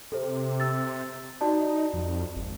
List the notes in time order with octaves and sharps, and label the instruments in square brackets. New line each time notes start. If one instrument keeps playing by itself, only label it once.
[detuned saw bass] C3 [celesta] A4 C5
[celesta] E6 A6
[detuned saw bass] D#4 [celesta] F#4 D5 A5
[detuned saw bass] F2
G#1